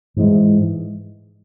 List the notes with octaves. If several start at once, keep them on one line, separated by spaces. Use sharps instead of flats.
G#2 E3 G#3